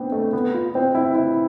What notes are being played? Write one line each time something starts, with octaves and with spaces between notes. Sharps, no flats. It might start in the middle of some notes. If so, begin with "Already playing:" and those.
Already playing: B3 C4 D4
A3
B3
F4
C4
E4
E4